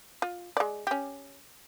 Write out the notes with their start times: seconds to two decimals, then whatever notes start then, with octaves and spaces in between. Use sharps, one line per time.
0.22 F4
0.57 G#3 D5
0.87 C#4 G4